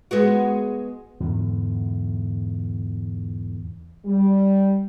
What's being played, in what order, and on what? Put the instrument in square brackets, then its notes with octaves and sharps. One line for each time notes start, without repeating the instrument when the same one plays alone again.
[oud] G#3 B3 F#4
[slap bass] E2 G#2 D3
[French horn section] G3